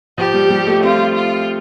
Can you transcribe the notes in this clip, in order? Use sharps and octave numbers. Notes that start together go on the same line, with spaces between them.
F3 G4
G3
G3
A3
C4 F4
F4